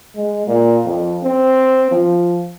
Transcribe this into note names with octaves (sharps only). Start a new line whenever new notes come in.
G#3
A#2
F2
C4
F3